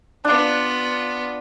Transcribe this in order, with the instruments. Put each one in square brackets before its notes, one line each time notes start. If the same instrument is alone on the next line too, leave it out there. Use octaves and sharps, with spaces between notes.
[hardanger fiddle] B3 F4 [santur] D4